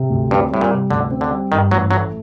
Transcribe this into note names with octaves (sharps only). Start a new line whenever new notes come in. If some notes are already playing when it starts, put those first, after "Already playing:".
Already playing: C3
D2
G2 C4
A2 G3
A#2
C3
D2 D3
C4
D3
G3
G2 D#3
A1 F#3
F#3 A3